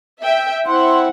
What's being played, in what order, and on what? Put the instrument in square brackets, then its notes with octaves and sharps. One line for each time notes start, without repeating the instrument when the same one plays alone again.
[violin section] E5 G5
[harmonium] C4 E4 [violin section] F#5 [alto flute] C6